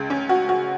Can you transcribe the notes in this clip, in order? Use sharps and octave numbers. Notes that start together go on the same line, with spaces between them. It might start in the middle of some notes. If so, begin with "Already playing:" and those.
Already playing: C#2 C#3
C#4
F#4
F#4